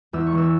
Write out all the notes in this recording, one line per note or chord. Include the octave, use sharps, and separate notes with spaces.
E2 E6
C#6
E3 B3 E6